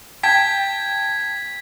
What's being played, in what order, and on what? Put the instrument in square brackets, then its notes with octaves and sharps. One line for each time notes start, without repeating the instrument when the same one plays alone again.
[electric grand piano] G5 A5 [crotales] G#6 B6